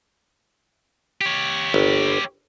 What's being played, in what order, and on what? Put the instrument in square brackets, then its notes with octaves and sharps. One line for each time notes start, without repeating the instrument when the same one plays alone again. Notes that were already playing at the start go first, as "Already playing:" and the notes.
[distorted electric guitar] G4 C#5
[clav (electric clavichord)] G1